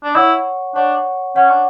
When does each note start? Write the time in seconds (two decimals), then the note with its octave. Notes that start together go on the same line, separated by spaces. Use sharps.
0.04 D4
0.15 E4 C#5 F#5 C#6
0.75 D4 C#5 F#5 C#6
1.36 C#4 C#5 F#5 C#6
1.49 D4